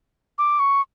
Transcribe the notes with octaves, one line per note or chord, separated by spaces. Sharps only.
D6
C#6